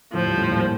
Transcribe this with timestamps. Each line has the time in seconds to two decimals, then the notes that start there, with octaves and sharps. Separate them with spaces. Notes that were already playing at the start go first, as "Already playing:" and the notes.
0.13 A2 F3
0.26 G2
0.38 A2
0.51 G2 A#2